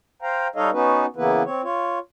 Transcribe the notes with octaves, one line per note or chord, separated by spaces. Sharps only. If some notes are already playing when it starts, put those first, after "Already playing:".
C5 F5 G5 A#5
G3 D#4 A4 C#5 D#5 F5
B3 C#4 D#4 F#4 B4
C#3 E3 A#3 B3 E4 B4
C4 C#5
F4 C#5